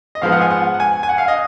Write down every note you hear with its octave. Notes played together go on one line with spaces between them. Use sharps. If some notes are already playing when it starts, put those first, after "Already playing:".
D#5
G#2 F3 G#3 B3 F5
F#5
G#5
F#5
F#5
G#5
G#5
F#5
F5
D#5